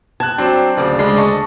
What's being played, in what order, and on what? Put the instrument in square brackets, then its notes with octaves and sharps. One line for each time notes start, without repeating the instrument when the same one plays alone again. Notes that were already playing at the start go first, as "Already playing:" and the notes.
[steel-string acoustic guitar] A5 [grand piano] F#6 G#6
[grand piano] F#3 C4 D4
[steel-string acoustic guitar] D2 D5 [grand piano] C#3
[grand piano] C#3 G#3 D4
D#5 A5 C#6